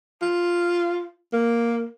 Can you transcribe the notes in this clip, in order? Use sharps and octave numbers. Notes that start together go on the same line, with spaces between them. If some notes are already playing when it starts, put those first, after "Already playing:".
F4
A#3